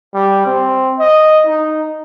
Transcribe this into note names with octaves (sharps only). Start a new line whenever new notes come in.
G3
C4
D#5
D#4